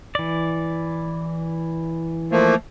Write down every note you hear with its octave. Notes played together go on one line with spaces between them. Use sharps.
E3 D5
F3 A3 A#3